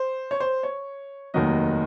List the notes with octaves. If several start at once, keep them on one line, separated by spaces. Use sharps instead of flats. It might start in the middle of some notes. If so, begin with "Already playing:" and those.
Already playing: C5
C#5
C5
C#5
F1 D#2 D#3 F#3 D#5